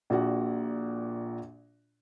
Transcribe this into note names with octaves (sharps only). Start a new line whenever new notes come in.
A#1 A#2 F#4 F#5